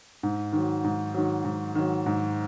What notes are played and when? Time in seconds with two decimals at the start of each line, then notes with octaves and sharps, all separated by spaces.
0.23 G#2
0.53 D#3 F#3
0.84 G#2
1.14 D#3 F#3
1.44 G#2
1.75 D#3 F#3
2.06 G#2